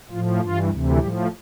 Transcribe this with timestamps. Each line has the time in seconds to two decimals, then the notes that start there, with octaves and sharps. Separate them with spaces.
0.11 A2 F3 F4
0.41 G2 E3 F4
0.70 D2 C3 E3
0.99 A2 F3 G3 G4